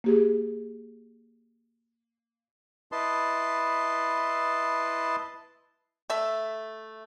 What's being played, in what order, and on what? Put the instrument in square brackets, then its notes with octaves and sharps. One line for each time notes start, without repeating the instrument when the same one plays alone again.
[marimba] A#3 G4 G#4
[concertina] E4 B4 D#5 A5 C6
[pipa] A3 E5